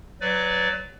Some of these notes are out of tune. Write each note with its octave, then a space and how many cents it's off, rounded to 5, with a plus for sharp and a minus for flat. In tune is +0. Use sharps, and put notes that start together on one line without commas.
F#3 +0 B4 +20 D5 -10